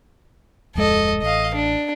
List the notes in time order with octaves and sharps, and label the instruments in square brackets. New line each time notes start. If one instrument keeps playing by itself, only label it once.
[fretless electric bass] D1 F2 G#3 [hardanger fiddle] A4 D#5
[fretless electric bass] A1 [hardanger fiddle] D#5 F5
[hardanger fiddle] D4